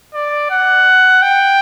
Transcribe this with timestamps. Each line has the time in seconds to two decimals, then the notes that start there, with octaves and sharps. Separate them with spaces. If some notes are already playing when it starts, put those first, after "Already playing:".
0.14 D5
0.50 F#5
1.22 G5